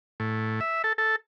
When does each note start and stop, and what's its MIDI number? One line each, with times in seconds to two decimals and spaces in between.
0.20 0.60 45
0.61 0.82 76
0.84 0.93 69
0.98 1.16 69